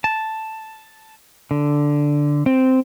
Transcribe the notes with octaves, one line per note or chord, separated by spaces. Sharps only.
A5
D3
C4